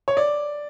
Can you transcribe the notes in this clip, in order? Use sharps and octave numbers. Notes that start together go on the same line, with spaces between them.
C#5
D5